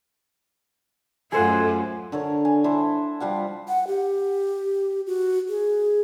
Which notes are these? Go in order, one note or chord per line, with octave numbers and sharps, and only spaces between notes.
F#2 A3 F4 G#4 A4 C5 F#5
D3 A4 A#4 C#5
G#5
D4 E4 A4 C5
F3 G3 F5 F#5
F#5
G4
F#4
G#4